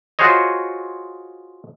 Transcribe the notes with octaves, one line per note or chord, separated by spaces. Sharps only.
F4 F#4 G#4 C5 C#5 D#5